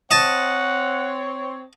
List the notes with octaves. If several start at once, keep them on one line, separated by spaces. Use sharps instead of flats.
C4 C#5 D#5 F#5 A5